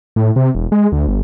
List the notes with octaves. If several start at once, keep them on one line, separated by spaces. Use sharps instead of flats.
A2
C3
E1
G#3
D2
G1